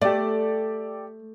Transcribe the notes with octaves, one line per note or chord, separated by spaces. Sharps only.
A3 G4 A4 D5